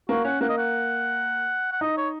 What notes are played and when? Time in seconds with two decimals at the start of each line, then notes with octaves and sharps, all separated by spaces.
0.09 A#3 F#4
0.25 C#4 F#5
0.41 A#3 F#5
0.49 D#5
0.58 F#5
1.72 F#5
1.81 D#4 D#5
1.97 C#5